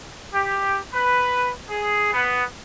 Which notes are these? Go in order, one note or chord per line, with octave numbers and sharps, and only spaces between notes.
G4
B4
G#4
B3